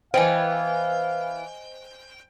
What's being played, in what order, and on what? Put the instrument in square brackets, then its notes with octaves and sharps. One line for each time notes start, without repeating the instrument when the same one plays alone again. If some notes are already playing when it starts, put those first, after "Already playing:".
[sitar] E3 B3 [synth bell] C5 D#5 G#5 [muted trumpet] F5 [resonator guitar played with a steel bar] G5